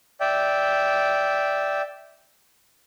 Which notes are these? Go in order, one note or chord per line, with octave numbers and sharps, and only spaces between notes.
D5 E5 G5